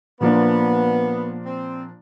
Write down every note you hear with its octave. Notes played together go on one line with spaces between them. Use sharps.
A#2 F3 A#3 B3 D4
C4